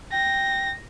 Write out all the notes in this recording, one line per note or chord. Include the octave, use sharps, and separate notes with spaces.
G5 A#6